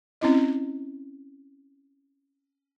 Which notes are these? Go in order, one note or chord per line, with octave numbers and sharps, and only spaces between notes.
C4 C#4 E4 D#5